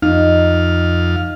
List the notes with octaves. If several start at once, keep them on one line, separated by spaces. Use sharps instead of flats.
F2 D#4 F5